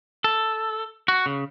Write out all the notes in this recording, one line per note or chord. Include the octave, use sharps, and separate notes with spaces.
A4
F#4
C#3